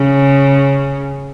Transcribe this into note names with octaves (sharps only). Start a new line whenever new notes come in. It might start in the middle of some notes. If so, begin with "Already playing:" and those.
Already playing: C#3